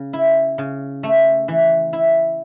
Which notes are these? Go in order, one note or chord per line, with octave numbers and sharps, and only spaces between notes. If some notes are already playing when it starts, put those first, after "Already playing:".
Already playing: C#3
E4
C#3
A3
E3
E4